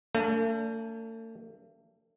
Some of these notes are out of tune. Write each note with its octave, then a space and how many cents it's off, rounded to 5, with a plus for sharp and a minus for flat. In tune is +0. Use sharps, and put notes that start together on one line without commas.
A3 +45 D4 -30